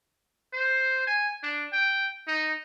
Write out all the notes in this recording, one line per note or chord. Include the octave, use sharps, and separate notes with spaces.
C5
G#5
D4
G5
D#4